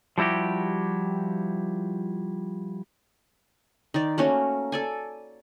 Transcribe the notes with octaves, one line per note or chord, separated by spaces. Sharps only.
F3 G3 E4 F#4 G4
D#3 D5
A3 A#3 C#4 F#4
A4 D5 G#5